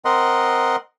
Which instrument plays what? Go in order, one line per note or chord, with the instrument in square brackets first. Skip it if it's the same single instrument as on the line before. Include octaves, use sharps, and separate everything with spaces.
[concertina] C4 A#4 D#5 F#5 C6